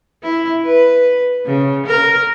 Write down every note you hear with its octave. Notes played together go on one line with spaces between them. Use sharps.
E4
B4
C#3
A#4